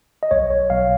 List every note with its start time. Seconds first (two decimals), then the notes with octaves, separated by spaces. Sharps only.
0.23 D#5
0.31 B1 C#5
0.50 C#5
0.70 B1 F5